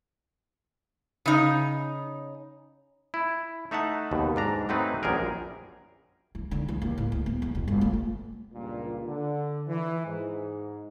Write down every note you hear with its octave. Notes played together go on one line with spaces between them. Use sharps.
C#3 D#4
E4
A3 D#4 E5 F#5 A5
D#2 B2
G#2 D4 A#5
F#3 A3 C4 D#4 B4
A#1 F#2 G3 G#4 A#4
E3
D3
E3
D#2
A2
D2
B3
E2
B2
G1
A3
A3
C#2 G2 A#2
D3
E3
G#2